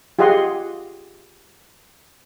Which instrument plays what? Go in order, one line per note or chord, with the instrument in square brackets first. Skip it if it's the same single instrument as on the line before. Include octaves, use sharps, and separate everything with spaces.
[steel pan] F4 G4 G#4 D#5 F#5 C6